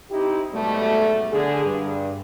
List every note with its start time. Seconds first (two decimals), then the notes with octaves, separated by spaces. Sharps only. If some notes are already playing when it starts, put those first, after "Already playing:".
0.11 C4 D#4 E4 G4
0.54 G#2 B2 F#3 G3 A3
1.32 D3 G#4
1.65 G2